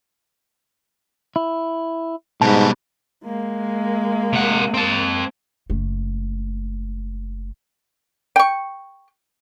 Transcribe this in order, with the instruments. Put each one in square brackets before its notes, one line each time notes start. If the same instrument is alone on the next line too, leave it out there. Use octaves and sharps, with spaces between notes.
[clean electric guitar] E4
[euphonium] G#2 [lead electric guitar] B2 G3 [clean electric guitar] A5
[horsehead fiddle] G#3 A#3
[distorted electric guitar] C3 F#5
C4 A5
[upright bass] F#1 A3
[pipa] G5 C#6